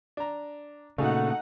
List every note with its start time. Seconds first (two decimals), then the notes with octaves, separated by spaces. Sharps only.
0.17 D4 A#5
0.98 A#2 C#3 A3 D#4 F#4 G#4 F5 F#5